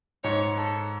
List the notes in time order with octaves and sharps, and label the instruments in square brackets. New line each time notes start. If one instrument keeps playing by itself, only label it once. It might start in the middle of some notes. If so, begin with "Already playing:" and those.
[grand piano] G#2 [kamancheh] C#5
[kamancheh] A4